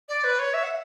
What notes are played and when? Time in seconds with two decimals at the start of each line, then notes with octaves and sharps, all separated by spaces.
0.08 D5
0.23 B4
0.39 C#5
0.53 E5
0.63 F#5